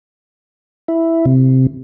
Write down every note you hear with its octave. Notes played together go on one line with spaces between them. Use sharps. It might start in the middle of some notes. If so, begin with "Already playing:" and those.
E4
C3